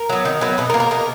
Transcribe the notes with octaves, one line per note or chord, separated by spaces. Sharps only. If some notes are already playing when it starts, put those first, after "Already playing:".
Already playing: A#4
F#3 B3
D#3
F#3 B3
B2 B4
A#4
A#3
A#4
B2 A#4